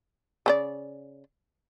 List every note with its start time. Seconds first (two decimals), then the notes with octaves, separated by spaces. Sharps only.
0.46 C#3 C#4 D5